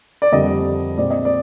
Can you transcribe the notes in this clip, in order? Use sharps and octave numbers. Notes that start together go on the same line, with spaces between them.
D5
F2 D3 G3 A#3 D#5
A#2 G#3 C4 D5
D#5
D5